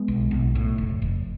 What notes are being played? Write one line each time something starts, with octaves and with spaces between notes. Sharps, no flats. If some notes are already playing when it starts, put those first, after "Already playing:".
Already playing: G#3 B3
B1
B1
A2
F1
F1